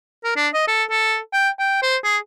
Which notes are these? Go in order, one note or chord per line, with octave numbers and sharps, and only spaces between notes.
A#4
D4
D#5
A4
A4
G5
G5
C5
G#4